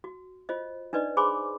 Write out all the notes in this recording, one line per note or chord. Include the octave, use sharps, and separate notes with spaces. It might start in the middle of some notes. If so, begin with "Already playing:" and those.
F#4
F4 C5 D#5
D4 D#4 B4 D5 D#5
G#4 C5 G#5 B5 C6 D6